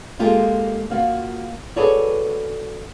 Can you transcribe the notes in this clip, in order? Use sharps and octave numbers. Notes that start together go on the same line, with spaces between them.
G#3 A#3 F4 G4 A4
A#3 F4 F#4
F#4 G#4 A4 B4 C#5 D5